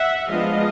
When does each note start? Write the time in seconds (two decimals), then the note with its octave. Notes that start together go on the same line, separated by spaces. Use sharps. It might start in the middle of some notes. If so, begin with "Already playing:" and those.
Already playing: E5 F#5
0.30 F3 G#3 B3 D4 D#5 F5